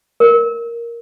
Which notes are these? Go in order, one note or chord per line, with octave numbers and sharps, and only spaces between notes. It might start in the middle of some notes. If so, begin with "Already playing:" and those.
A#4